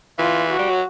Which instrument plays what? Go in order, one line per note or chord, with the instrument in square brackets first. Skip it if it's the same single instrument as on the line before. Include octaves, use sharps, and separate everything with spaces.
[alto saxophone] E3 [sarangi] F4
[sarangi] F#4
[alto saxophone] G3
F#3